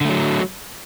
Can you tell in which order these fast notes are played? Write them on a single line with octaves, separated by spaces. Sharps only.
D3 A3 F#3